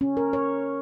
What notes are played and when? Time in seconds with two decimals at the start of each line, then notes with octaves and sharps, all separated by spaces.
0.01 C#4
0.17 A#4
0.33 C#5